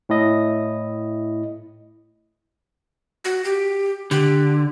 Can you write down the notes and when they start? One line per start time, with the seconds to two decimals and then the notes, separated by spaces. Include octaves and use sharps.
0.09 A2 E4 D#5
3.24 F#4
3.44 G4
4.11 D3 G4